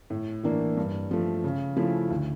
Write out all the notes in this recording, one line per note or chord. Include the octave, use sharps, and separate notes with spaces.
A2
E3 A#3 D4
G2
F3 A3
C#3
F3 A3 C#4 E4
D2